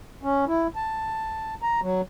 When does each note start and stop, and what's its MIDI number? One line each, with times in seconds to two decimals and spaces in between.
0.23 0.45 61
0.47 0.67 64
0.76 1.55 81
1.62 1.80 82
1.82 2.01 54